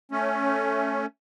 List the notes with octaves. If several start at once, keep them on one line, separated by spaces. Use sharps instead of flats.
A3 C#4